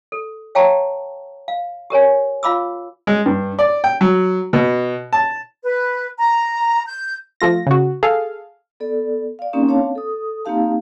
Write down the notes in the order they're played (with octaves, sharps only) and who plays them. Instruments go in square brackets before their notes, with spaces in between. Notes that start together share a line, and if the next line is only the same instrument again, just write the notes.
[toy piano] A4
C#5 F5 G5 A5 A#5 C#6
F5
G4 A#4 C#5 G#5
F4 F5 B5 D6 E6
[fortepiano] G#3
G2
D5
G5
F#3
B2
A5
[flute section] B4
A#5
G6
[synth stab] F3 A3 F4 A#6
C#3 F#4
G#4 A4 F5
[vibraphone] B3 A4 D5
D5 F5
A#3 C4 C#4 D#4 G4 A#4
C4 D4 C#5 F5 A5
A4 D#6
A#3 C4 D#4 G4 F5 A5